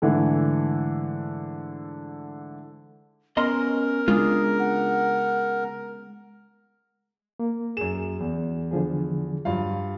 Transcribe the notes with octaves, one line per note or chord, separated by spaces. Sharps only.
G#2 D3 E3 A3
B3 C#4 A#4 D#5 A#5 C6
C#3 G#3 D4 F4 G#4
F#5
A#3
F#2 G#4 E7
E2
D3 F3 G#4
G2 F#3 F4 F5